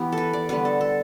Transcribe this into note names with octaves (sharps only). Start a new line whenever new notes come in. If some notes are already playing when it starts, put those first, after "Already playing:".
Already playing: E3 B3 E4 G4
A4
B4
D5
D3 G3 B3 B4
A4
A4